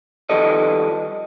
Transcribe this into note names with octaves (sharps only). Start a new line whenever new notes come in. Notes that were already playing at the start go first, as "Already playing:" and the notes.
D#3 F3 G3 A4 B4 D#5